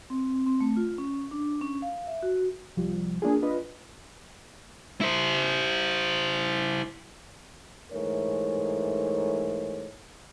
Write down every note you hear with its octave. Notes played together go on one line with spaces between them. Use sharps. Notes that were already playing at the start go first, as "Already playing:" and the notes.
C4
C4
A3
F4
C#4
D4
C#4
F5
E5
F#4
C2 F3 G3
A#3 D4 F4 G#4
D4 F4 B4 D#5
E4 C5
G#2 E3 A3 A#4 C#5